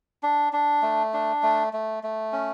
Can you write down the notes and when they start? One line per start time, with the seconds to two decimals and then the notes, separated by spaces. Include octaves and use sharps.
0.23 D4
0.53 D4
0.82 A3
1.13 D4
1.43 A3
1.73 A3
2.03 A3
2.33 C#4